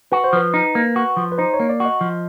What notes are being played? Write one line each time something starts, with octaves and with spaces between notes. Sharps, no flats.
F#4 B4
C5
F3 B4
D#4
A#3
F#4
F3
B4
D#4 C5
C#5
A#3
D5
F#4 D#5
F3